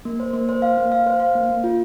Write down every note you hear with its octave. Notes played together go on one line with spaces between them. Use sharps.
A#3
C5
A#3
C5
F5
A#3
F5
C5
F5
A#3
A#3
F4